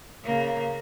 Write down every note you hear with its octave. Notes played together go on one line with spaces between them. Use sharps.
C#3 A#3